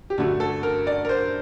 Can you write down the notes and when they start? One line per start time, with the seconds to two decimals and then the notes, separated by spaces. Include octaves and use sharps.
0.10 G4
0.18 G2 D3 A3 F#4
0.40 A4
0.63 A#4
0.87 D5
1.05 A#4
1.09 C5